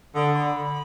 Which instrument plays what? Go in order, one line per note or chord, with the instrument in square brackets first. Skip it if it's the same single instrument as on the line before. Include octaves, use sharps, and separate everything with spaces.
[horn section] D3 [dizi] D#6
[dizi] B5